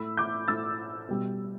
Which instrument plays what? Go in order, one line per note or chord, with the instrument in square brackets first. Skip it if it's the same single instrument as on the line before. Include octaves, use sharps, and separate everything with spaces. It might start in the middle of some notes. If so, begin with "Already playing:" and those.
Already playing: [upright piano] A2 A3 B5 E6
D6 G6
A2 A3 E6 A6
B2 G3